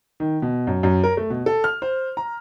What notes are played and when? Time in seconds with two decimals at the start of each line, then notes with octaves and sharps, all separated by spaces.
0.20 D#3
0.42 B2
0.67 F#2
0.83 F#2
1.04 A#4
1.17 A3
1.30 B2
1.46 A4
1.64 F6
1.82 C5
2.17 A#5